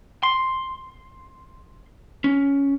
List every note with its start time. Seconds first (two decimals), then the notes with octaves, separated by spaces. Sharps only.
0.23 C6
2.24 C#4